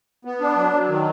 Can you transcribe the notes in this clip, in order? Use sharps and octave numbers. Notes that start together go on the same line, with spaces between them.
B3
D4
F#3
F#3
D#3